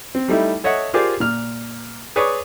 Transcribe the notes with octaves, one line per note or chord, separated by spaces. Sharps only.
C4
G3 A3 D#4 E4
A4 C#5 D#5 E5 F#5
F4 G4 G#4 A#4 C5 D5
A#2 F6
G#4 B4 C#5 D5 C#6 D#6